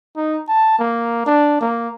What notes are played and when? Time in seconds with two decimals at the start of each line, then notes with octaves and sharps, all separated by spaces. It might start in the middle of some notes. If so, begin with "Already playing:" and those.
0.17 D#4
0.48 A5
0.79 A#3
1.26 D4
1.61 A#3